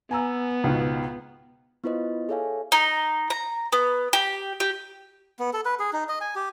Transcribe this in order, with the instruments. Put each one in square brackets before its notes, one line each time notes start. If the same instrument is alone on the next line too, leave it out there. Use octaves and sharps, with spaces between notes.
[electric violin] B3 [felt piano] G#5 A#5 E6
[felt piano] C#2 G#2 B2
[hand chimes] B3 E4 F4 B4 C5 D#5
G#4 A4 C#5 E5 F5 G#5
[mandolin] D#4
A#5
B3
G4
G4
[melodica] B3
A4
B4
G#4
D#4
D#5
G#5
G4